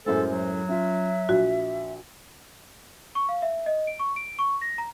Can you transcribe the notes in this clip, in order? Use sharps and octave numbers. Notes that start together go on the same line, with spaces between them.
F#2 A2 G#3 A4 C5
F#3
C#4 F4 E5
A#1 F#4
C#6
F5
E5
D#5
D7
C#6
D7
C#6
A#6
A#5